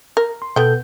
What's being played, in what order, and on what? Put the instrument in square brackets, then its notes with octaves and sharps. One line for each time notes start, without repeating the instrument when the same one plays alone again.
[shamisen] A#4
[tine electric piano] C6
[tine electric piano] B2 A4 G6 [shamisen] B3 G5